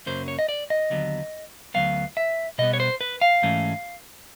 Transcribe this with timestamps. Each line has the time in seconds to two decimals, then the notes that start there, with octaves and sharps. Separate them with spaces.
0.06 F#2 C#3 F#3 A#3 C#4 C5
0.28 C#5
0.39 D#5
0.49 D5
0.70 D#5
0.90 D#2 D3 F#3 B3
1.74 D2 C#3 F#3 B3 F5
2.17 E5
2.58 B2 G3 B3 D#5
2.74 C#5
2.80 C5
3.01 B4
3.21 F5
3.42 G#2 E3 A3 C#4